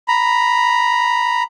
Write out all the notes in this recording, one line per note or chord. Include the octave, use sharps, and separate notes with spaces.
A#5 B5